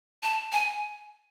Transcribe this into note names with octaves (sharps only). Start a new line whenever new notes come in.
A5
G#5